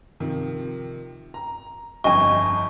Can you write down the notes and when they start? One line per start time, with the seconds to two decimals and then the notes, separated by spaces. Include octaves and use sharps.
0.20 C3 D#3 F3
1.34 A#5
2.04 G1 F2 D#5 G#5 C#6